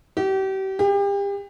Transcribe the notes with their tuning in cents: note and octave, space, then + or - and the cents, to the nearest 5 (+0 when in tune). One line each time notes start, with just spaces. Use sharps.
G4 -35
G4 +35